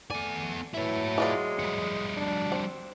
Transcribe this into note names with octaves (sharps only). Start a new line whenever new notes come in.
A3 B3 D5 G#5
E3 F#3 E4 C#5
E3 G#3 F4 D5
G3 F#4
D4
C4